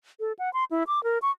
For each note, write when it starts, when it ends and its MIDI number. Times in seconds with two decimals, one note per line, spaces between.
0.20 0.32 69
0.39 0.52 78
0.53 0.64 84
0.71 0.83 64
0.87 1.02 86
1.04 1.18 70
1.22 1.31 85